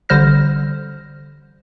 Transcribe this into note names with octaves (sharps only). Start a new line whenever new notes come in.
A1 D3 G3 C5 F6 A#6